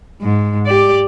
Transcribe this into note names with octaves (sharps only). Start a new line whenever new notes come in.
G#2
G4 D5